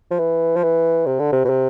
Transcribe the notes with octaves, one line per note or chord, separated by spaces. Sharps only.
F3
E3
F3
E3
C3
D3
C3
B2
C3